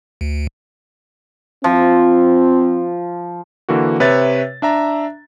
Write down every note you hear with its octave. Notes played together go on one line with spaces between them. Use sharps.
D2
F3 C4
D3 E3 A#3 F#4
C3 B4 C#5 E5 A6
D4 E5 A#5